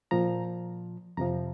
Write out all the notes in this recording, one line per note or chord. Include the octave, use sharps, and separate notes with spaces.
A#2 F3 A#5
F2 C3 F3 A#5